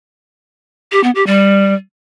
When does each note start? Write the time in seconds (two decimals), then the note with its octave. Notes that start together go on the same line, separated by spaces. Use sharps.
0.92 G4
1.04 B3
1.15 G4
1.27 G3